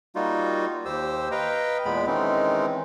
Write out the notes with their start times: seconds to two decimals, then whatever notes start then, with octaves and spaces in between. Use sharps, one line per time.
0.15 G3 A#3 D#4 F4 F#4
0.86 D#2 G4 C5 E6
1.31 B4 D#5 F5 G5 A#5
1.85 E2 A#2 G#3 B3 B5
2.07 D#3 E3 G#3 C4 C#4 D#4